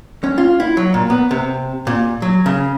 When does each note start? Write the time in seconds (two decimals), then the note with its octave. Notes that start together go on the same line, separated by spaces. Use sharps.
0.24 C#4
0.38 F4
0.60 E4
0.77 F#3
0.94 A#2
1.10 B3
1.31 C3
1.87 A#2
2.22 F#3
2.46 C#3